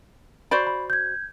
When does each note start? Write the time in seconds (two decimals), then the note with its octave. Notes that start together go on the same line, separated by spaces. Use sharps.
0.51 F#4 C5 D5 B5
0.67 B5
0.90 G6 G#6